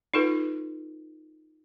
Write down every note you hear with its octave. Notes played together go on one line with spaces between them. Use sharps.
D#4 F4 A4 B4